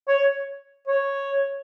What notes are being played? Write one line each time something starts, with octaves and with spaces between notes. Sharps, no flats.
C#5
C#5